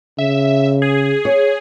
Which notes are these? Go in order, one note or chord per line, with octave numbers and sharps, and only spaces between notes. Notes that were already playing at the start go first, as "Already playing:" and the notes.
C#3 E5
G#4
C#5